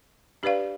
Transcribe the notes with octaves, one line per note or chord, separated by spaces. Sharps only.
D4 G4 B4 D5 F5